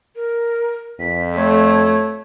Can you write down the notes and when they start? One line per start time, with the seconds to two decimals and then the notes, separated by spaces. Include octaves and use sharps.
0.15 A#4
0.99 F2 B6
1.35 A3 C#5